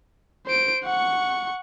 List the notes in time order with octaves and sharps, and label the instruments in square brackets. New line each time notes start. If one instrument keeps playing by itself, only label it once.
[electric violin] C5 D7
F#5 C#6